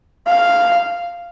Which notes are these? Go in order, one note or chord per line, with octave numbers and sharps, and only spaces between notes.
F5